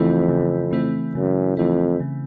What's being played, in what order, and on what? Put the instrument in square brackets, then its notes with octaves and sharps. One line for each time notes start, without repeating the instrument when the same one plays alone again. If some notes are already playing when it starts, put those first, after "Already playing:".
Already playing: [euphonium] F2 [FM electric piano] C#3 E3 A3 C4 E4
[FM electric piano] C#3
E3 A3 C4 E4
[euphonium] F#2 [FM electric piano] C#3
[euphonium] F2 [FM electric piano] E3 A3 C4 E4
[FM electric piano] C#3